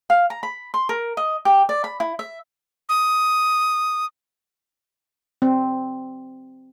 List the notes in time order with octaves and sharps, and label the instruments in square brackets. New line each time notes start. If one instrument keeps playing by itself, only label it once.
[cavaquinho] F5
A#5
B5
C6
A#4
D#5
G4
D5
B5
E4
E5
[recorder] D#6
[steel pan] C4